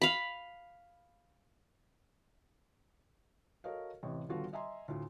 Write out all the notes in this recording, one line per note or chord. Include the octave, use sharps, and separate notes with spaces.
F5 B5
F#4 A4 A#4 C#5 D#5 F5
A1 C3 D#5 C#6
D#1 D3 B3 F4 F#4 A4
D#5 E5 G#5 A#5 C6
D2 A2 F4